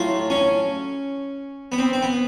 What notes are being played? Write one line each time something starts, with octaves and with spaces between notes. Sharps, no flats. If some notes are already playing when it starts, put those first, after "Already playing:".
Already playing: A2 F#3 A3 F4
C#4
B3
C4
C4
B3